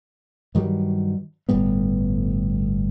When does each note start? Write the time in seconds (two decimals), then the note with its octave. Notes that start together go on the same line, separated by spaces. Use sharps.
0.55 G2 D#3 F#3 G3
1.49 G1 A2 G3 B3